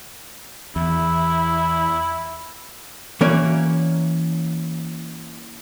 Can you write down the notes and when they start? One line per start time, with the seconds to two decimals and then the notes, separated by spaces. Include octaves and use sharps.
0.76 E2 E4
3.21 E3 A#3 C#4 F#4 C#5 D5